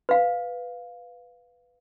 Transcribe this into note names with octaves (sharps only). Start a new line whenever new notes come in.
B4 F5